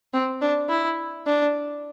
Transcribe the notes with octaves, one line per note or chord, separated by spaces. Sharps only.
C4
D4
E4
D4